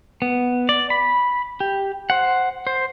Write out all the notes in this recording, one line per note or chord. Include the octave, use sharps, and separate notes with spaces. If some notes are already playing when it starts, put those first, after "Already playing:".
B3
D5
B5
G4
C5 F#5
C5